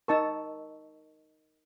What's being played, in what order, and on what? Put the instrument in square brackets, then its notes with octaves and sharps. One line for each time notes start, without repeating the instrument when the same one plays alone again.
[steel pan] D#4 A5 C#6 [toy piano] A#4 D#5 E6